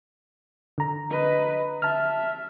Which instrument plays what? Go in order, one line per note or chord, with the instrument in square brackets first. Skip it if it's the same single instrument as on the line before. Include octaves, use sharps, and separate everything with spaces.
[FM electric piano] D3 A#5
[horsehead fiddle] B4 D#5
[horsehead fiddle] E5 [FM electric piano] A5 F6